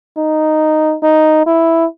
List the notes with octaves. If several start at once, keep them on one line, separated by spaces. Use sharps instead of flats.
D#4
D#4
E4